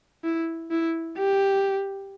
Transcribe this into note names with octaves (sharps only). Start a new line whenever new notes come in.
E4
E4
G4